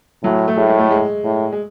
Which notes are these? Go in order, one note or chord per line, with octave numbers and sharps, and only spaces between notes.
A2 F#3
A3
A2 G#3
G#3
A3
G#3
A2
G#3